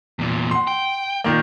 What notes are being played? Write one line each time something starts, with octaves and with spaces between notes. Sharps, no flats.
E2 A#2
F#5 C6
G5
A#2 D#3 A#3